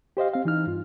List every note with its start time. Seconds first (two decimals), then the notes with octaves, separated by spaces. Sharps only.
0.17 G4 C5 D#5 F5
0.34 C4 F5
0.45 E3 D#4 F6
0.67 G2 F4